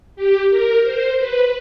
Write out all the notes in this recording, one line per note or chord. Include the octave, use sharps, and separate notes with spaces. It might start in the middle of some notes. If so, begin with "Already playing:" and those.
G4
A#4
C5
B4